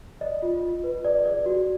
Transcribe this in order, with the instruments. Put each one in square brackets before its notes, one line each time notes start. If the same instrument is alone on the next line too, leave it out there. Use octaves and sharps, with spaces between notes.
[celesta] D5 D#5
F4
F4
B4
G#4 D5
G#4 D5
F#4